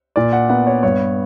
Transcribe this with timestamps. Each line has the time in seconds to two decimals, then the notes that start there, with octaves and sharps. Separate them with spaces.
0.16 A#2 D5
0.33 F#5
0.49 B3 F#5
0.67 C#5
0.83 G2 C#5